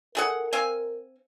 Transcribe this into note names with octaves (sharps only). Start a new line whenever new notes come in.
A3 G#4 A#4 F#5
C4 F5 G#5